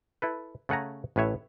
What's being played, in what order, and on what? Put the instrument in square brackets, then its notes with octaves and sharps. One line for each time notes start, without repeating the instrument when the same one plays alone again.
[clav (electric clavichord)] E4 A4 B4
C#3 A3 F#5 G#5 A#5
A1 A2 B4 C#5 E5